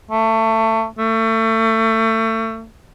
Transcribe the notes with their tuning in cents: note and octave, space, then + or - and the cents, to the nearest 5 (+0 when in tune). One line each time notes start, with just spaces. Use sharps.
A3 +25
A3 +30